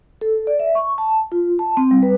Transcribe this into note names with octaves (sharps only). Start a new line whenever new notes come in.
A4
D5
E5
C#6
A5
F4
A5
C4
G3
B4